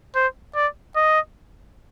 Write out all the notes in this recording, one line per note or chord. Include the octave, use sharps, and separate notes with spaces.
C5
D5
D#5